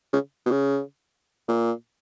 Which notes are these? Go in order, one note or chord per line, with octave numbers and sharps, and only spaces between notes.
C#3
B2
C#3
A#2